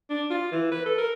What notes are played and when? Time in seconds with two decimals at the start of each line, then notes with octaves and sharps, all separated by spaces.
0.10 D4
0.30 F4
0.52 E3
0.71 B4
0.86 A4
0.98 A#4